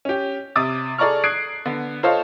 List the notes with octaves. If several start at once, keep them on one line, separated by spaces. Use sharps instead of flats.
C#4 G4
C3 D6 D#6 A6
G#4 A4 D5 A#5 C#6 F6
D#6 F#6 G#6 C7 D7
D3 B3
F4 A4 C5 C#5 D#5 F5